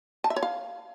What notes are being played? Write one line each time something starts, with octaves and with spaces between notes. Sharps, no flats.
A5
E5
C#5
F5